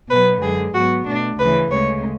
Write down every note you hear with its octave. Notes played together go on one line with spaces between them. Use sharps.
B2 F#3 B3 B4
F#2 D3 G#3 G#4
G#2 F#3 B3 F#4
B2 A3 D4
D2 C#3 E3 B4
D2 C#3 G#3 C#5